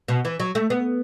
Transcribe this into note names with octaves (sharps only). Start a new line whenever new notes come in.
B2
E3
F#3
A3
B3